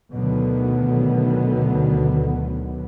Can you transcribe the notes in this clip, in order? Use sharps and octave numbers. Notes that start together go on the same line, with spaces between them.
D2 B2 D3 D#3 F#3 B3